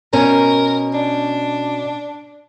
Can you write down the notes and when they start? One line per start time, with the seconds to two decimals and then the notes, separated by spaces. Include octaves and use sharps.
0.13 B2 C#4 A#4
0.93 D4